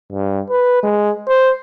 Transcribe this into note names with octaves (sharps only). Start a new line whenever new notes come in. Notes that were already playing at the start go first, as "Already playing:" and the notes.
G2
B4
G#3
C5